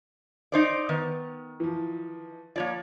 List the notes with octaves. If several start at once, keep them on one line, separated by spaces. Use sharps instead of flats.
D#4 C5 D5
D#3 B3
E3 F3
F3 A#3 C#5 D5